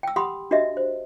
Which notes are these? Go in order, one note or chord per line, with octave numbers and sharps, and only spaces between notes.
G5 E6
G4 F#5 B5 C6 D#6
D4 F#4 G4 A#4 D#5 E5
C5